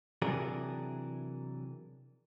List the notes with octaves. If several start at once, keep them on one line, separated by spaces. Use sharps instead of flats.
C3 E3 F#3 D4 G#4 A#4